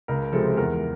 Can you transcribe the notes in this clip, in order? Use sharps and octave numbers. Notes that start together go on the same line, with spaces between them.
C#2 A#4
C3 F3 G#3 A4
E2 A#4